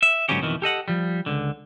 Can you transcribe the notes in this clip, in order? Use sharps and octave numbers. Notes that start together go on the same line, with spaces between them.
E5
G#2 D3 F#3 B3 C#4 G4
F2 B2 D#3 E3
G4 A4 D#5 F#5
F3 G3
C#2 D3